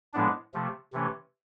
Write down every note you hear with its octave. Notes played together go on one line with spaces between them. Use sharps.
A2 F3 G#3 B3 D4
C3 F3 A3
C3 E3 A3 C#4